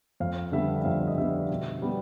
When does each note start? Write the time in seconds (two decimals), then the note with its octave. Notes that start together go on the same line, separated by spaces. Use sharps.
0.20 F2 F5
0.52 D3 G3 B3 E5
0.81 E5
0.84 F2 F5
1.08 D#5
1.17 D3 G3 B3 E5
1.50 B2
1.82 G3 B3